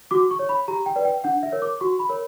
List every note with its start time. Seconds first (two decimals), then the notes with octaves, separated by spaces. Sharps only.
0.11 F#4 D6
0.31 C#6
0.39 C#5
0.49 B5
0.68 G4 A#5
0.86 G5
0.96 B4 D5
1.05 G5
1.24 D4 F#5
1.43 E5
1.52 A#4 C#5
1.62 D6
1.80 F#4 C#6
1.99 B5
2.09 A#4 C#5